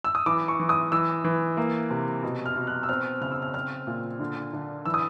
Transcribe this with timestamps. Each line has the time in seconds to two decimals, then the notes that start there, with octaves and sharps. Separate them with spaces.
0.04 E6
0.15 D#6
0.26 E3 D6
0.48 C#6
0.59 E3
0.69 D#6
0.92 E3 E6
1.24 E3
1.57 A#3
1.90 C3
2.23 B2
2.46 F6
2.56 B2
2.67 F#6
2.83 E6
2.89 C4 F6
3.21 C#3 F6
3.32 E6
3.42 F6
3.54 C4 F6
3.87 A#2
4.20 D3
4.53 D3
4.85 E3 E6
4.94 D#6